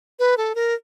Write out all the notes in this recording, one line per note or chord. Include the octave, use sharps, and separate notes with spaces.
B4
A4
A#4